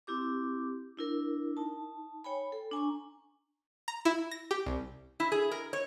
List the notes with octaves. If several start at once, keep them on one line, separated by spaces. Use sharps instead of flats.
C4 E4 G4 D6
D4 E4 A#4
D#4 A5
C#5 G5 G#5 B5
A4
D4 G#5 A#5 C#6
A#5
E4
A#6
G4
C2
E4
G#4
A#4
C#5